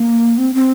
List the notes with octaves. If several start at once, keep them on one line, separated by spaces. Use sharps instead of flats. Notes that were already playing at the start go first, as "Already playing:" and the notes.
Already playing: A#3
C4
C4